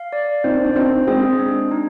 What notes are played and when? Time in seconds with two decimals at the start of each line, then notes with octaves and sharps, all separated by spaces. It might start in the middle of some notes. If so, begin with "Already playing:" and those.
Already playing: F5
0.13 D5
0.44 C4 D#4 C5
0.64 D4
0.76 C4 D#4 C5
1.07 G#3 C4 G#4
1.39 D4
1.71 D#4